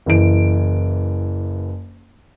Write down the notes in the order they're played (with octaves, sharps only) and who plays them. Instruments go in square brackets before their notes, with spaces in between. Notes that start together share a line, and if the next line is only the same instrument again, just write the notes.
[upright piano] F#1 E3 D7